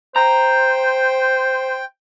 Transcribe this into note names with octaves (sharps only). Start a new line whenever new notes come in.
C5 G5 A#5